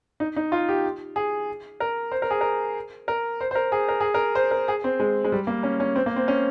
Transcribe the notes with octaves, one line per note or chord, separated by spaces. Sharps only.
D#4
D#4
F4
G4
G#4
A#4
C5
A#4
G#4
A#4
A#4
C5
C5
A#4
G#4
A#4
G#4
A#4
C5
A#4
G#4
C4
G#3
G#3
G3
A#3
C#4
C#4
C4
A#3
C4
C#4